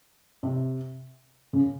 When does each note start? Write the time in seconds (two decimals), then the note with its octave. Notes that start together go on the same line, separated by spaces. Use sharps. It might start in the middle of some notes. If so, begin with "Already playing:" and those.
0.43 C3
1.53 C#3